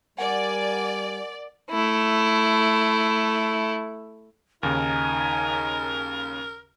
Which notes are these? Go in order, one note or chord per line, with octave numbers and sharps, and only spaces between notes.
G3 A#4 D5 F#5 G#5
A3 E4
D#2 C#3 D#4 A#4 G#5